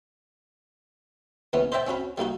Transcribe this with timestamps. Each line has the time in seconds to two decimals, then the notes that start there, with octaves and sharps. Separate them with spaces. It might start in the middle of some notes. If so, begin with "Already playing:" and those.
1.53 D#2 E3 B3 C#4
1.72 C5 D#5 E5 G5 A5
1.87 C4 C#4 F#4 B5
2.18 G3 A#3 D#4 F#4